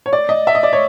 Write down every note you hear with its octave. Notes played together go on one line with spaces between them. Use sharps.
C#5
D5
D#5
E5
D#5
D5
C#5